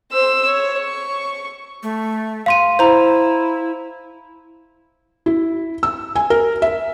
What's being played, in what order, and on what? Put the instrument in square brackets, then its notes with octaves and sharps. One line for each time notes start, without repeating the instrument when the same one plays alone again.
[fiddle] C5 E6
C#5
C#6
[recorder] A3
[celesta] F5 C6 D#7
[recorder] E4 [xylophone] C5 A#5
[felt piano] E4
E6
G#5
A#4
E5